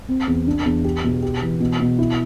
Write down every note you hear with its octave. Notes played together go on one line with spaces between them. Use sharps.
C4
E2
D4
E2
G4
B2
G4
E3
B2
B2
E4